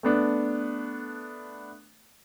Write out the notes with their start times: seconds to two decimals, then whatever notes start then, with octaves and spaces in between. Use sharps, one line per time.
0.03 A3 B3 D4